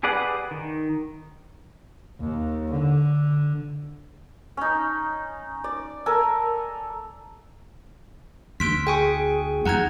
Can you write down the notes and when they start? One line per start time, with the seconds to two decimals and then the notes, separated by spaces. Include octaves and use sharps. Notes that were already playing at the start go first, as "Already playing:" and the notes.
0.03 G4 G#4 B4 D5 F#5
0.51 D#3
2.20 D#2
2.72 D3
4.57 C#4 D#4
5.64 D5
6.06 A4 A#4 G#5
8.60 D2 C6 B6 D7
8.87 G#4 G5 G#5 C#6
9.65 D#2 F#5 A#5 G#6